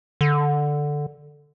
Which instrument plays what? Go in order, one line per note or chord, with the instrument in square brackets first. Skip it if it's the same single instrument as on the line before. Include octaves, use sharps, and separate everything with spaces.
[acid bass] D3